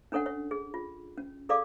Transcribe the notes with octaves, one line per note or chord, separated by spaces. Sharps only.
C#4 D4 A4 C#5 F#5
C#5
G#4
F4
C#4
G#4 A4 D5 F5 D6